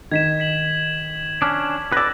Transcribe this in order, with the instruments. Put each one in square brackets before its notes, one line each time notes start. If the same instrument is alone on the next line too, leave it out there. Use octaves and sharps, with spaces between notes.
[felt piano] D#3 [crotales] G#6 B6 E7
[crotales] B6 F#7
[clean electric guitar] C#4 D4
[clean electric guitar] B4 D5 [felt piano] E6 A#6